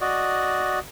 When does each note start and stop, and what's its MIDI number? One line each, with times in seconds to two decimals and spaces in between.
0.01 0.79 66
0.01 0.79 74
0.01 0.79 75